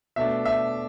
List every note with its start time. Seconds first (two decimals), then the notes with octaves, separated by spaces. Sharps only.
0.16 B2 A3 D4 E5
0.45 E5